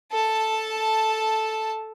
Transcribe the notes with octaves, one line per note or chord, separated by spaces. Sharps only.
A4 A5